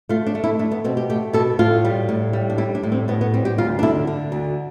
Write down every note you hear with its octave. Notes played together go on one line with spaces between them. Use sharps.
A3 F4
D4
A3
E4
A3 D4
B3
B2 C4
G4
A3 G4
B2 A4
A2 F4
G3
A2
G3
D4
G3 E4
D4
A2
C4
A2 B3
B3
G3 C4
G4
D2 F4
D4
D3 E4
D3
D2